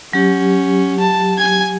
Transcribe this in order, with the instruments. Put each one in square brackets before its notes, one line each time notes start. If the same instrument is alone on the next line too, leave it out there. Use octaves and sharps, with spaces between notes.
[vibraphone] F#3 G4 [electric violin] C#4
[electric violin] A5
G#5 G#6